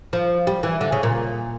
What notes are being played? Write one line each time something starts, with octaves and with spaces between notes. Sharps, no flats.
F3
G3
E3
D3
C#3
A#2